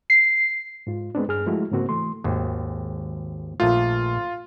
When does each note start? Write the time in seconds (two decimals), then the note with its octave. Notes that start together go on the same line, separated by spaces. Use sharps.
0.10 C7
0.87 G#2 F4
1.15 G#3 B3 C4 D4
1.28 G2 G#4 F6
1.46 F3 G#3 A3 E4 F#4
1.71 G#2 C#3 A#3 C4 F#4
1.89 E3 A3 C6
2.24 G#1 D#2
3.60 A#1 A3 F4